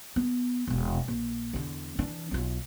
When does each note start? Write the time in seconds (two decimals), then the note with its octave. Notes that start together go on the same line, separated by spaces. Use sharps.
0.16 B3
0.67 E1 B2
1.08 A#1
1.53 E2 D3
1.99 E3 D4
2.31 B1 F4